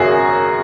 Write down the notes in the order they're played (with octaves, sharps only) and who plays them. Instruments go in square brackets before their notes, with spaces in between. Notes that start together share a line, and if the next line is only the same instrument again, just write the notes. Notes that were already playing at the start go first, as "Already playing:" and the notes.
Already playing: [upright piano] G#1 F#2 C#3 F#4 G#4 A#4